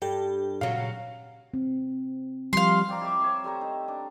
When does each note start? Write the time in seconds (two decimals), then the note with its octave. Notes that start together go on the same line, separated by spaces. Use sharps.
0.02 G2 G4 A4 G5
0.61 A#2 C#3 F#3 C#4 F5
1.54 C4
2.53 F3 G3 F5 C6
2.88 C4 D5 A#5
3.01 E4 E5 D6
3.22 C4 C#5 E5
3.44 G3 A3 C5 A#5
3.61 D#4
3.88 D4